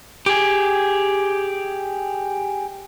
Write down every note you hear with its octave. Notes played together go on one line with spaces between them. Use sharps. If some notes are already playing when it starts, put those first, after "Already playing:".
G4 G#4